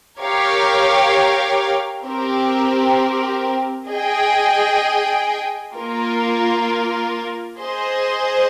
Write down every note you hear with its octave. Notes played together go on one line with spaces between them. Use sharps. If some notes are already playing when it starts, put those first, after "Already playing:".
G4 A#4 C#5 F5
C4 G4 A#4
G#4 D#5 G5
A#3 F4 A#4
G#4 C5 D#5